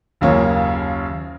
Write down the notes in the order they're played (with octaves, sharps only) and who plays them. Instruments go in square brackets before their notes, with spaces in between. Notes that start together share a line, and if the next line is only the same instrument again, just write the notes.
[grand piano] F#1 D#2 C#3 A#3 F4 C#5